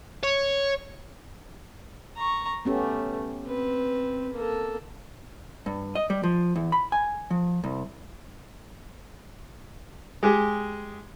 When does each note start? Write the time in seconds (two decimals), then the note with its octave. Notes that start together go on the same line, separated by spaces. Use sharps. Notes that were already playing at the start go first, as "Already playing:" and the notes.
0.23 C#5
2.17 A#5 C#6
2.65 A3 B3 C#4 G4
3.45 C4 B4
4.33 A#3 A4
5.66 G2
5.95 D#5
6.10 G3
6.24 F3
6.56 E2
6.72 B5
6.92 G#5
7.31 F3
7.64 C2
10.23 G#3 G4 G#4